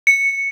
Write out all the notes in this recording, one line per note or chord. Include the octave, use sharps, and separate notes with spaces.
C#7